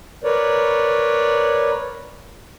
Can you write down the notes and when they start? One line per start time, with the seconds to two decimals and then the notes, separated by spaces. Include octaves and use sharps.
0.24 A#4 B4 C#5 D5